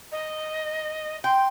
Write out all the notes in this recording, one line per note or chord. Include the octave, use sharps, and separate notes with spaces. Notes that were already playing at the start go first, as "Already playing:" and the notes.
D#5
G5 C6